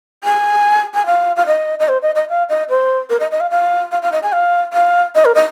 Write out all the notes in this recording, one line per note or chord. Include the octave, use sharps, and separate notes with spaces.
G#5
G#5
F5
F5
D#5
D#5
C5
D#5
D#5
F5
D#5
C5
A#4
D#5
D#5
F5
F5
F5
F5
D#5
G#5
F5
F5
D#5
A#4
D#5